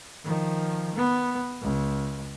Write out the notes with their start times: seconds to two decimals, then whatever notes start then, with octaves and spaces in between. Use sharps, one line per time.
0.24 D#3 F3
0.96 B3
1.61 C#2